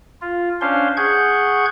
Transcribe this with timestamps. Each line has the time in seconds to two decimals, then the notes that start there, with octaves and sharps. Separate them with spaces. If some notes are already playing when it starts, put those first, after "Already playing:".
0.21 F4
0.61 C#4 D4 C5 F5 C6
0.97 G#4 F#5 C#6 G6 G#6